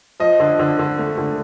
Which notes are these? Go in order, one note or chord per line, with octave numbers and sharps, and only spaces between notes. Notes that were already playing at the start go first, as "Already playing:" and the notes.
F3 D#5
D3
D3
D3
A3
D3